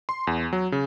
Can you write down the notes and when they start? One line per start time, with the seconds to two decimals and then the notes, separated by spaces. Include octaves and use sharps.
0.09 C6
0.27 E2
0.53 F#3
0.72 C#3